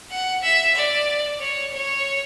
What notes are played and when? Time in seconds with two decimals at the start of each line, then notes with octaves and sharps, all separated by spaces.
0.11 F#5
0.43 E5
0.75 D5
1.40 C#5
1.73 C#5